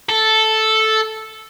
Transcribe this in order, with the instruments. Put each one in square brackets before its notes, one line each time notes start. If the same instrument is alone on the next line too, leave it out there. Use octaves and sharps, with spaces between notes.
[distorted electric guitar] A4